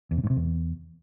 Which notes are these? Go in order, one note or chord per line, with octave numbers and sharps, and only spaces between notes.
E2
C3
G#2
C3
E2